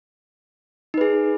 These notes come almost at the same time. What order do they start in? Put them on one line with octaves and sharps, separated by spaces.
D#4 B4 G#4